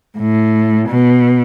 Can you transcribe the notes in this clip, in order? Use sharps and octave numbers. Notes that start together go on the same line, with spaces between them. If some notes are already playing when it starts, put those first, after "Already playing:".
A2
B2